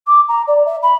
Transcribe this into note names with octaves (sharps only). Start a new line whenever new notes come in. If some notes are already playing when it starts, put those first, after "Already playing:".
D6
A#5
D5
E5
B5